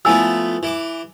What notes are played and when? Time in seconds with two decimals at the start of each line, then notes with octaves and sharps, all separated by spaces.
0.05 F3 A3 B3 E4 G#5 E6
0.63 E3 D6